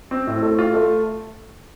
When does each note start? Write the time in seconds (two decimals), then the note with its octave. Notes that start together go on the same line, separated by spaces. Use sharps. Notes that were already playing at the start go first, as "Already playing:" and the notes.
0.11 C4
0.27 A2
0.43 A3
0.59 F4
0.74 A3